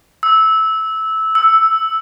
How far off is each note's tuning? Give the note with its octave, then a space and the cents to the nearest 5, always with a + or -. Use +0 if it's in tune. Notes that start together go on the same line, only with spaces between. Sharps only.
E6 -15
E6 +0